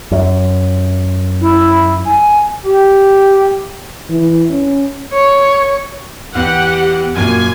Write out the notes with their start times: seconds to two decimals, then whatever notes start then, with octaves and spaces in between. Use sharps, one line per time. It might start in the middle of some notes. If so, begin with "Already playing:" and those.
0.11 F#2
1.41 E4
2.06 G#5
2.64 G4
4.10 E3
4.50 C#4
5.12 C#5
6.35 E2 G4 F#5
7.16 F#2 A#2 G#5